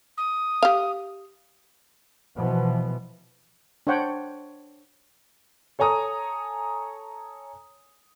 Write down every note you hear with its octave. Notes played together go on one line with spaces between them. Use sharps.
D#6
G4 F5
B2 E3 F3 B3
D4 C5 C#5 F#5 G5
A4 C#5 G#5 A#5 D#6